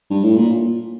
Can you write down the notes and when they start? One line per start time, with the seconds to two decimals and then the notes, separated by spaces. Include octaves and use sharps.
0.10 G2
0.24 A2
0.36 A#2